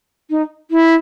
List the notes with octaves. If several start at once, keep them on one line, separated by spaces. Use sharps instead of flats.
D#4
E4